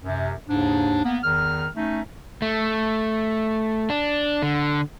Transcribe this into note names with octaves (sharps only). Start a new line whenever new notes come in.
F#2 C3
D#2 G#2 C#3 D4
A#3 B3
E2 D#3 F6
A3 C#4 D#4
A3
D4
D3